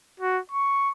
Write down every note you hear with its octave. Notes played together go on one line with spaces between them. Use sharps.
F#4
C#6